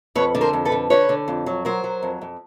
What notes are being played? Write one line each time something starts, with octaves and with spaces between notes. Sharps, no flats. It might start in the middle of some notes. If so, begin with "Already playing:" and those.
F2 B4 C#5
D3
A#4 C5
F2
A4 B4
D3
D3 B4 C#5
D3
F2
F#3
F#3 A#4 C5
F#3
F2
F2